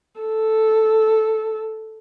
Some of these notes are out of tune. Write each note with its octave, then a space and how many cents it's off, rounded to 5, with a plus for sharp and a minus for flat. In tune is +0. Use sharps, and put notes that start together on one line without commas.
A4 -5